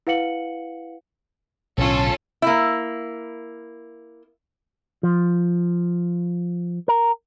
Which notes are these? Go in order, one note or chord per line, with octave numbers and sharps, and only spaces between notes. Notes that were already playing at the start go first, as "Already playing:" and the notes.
E4 B4 F5 F#5 C#7 F#7
B1 A2 D3 C#4 F4 A4
A#3 E4
F3
A#4